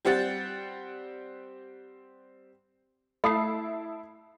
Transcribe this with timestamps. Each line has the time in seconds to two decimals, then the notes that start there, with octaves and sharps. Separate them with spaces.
0.05 G3 C4 G4 F#5 A6
3.24 A3 E4 A5 B5 D#6 C7